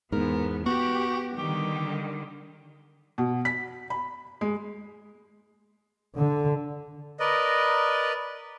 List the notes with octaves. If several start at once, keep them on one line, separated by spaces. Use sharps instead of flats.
E2 G#2 B3 A#4
B3 F#4 G4
D3 D#3 G3 G4
B2
B6
B5
G#3
D3
A#4 B4 D5 D#5